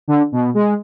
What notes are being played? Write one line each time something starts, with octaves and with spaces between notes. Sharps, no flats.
D3
B2
G#3